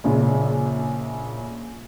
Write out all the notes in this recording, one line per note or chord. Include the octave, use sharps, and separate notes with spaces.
A#1 C#3 D4